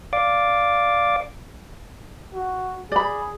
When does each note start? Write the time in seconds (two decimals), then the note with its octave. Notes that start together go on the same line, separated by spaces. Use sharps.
0.13 D5 F5 D6
2.34 F#4
2.92 G#4 D5 B5